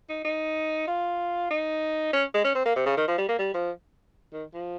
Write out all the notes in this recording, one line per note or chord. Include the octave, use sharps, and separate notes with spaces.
D#4
D#4
F4
D#4
C#4
G#3
C#4
C4
A#3
C3
C#3
D#3
F3
G3
A#3
G3
F3
D#3
F3